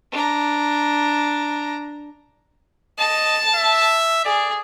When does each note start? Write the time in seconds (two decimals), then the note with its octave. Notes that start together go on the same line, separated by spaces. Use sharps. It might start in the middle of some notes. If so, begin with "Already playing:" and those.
0.12 D4 A#5
2.99 D#5 A5
3.55 E5
4.25 G#4 D5